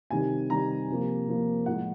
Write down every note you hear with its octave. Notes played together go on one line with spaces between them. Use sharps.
C3 D#3 G3 G#5
C3 D#3 G3 A#5
C3 F3 A#3
C3 F3 A#3
A2 F3 G#3 F#5